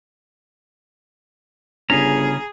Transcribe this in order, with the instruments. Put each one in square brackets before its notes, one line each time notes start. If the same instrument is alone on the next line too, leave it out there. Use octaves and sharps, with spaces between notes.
[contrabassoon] G1 [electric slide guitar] C#3 C#4 [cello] G#4 [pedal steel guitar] A#5